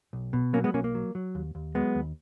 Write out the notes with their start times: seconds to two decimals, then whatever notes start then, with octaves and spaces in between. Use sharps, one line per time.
0.13 B1
0.33 B2
0.53 F#3 A#3 C#4
0.64 G#3 B3
0.74 B1 A#3 C#4
0.84 A#3
0.95 F#3
1.15 F#3
1.35 D#2
1.55 D#2
1.75 F#3 G#3 B3
1.95 D#2